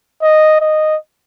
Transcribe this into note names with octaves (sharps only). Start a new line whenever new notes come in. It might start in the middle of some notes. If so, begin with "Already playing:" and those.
D#5
D#5